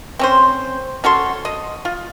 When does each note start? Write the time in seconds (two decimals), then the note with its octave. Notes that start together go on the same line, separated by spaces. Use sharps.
0.19 C4 C#4 C5
1.04 C#4 F#4 A4 C6
1.45 D#5
1.85 F4